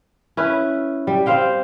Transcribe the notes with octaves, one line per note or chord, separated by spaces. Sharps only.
C#4 E4 B4
G3
C4 C5 F5 G5